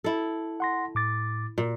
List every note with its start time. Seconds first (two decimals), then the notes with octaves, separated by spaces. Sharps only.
0.04 E4 A4
0.60 F#5 C6 A#6
0.95 A2 D6 A6
1.58 A#2